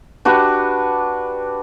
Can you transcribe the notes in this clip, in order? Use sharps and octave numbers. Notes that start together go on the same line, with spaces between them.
D4 F#4 G4 B4